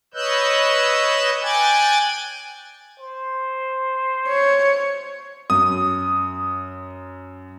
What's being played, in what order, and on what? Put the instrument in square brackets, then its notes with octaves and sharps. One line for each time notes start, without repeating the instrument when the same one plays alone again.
[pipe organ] B4 C#5 D#5 E6 F#6 G6
G5 G#5 D6 F#6 G#6 A6
[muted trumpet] C5
[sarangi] C#5
[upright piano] F#2 [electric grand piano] D#6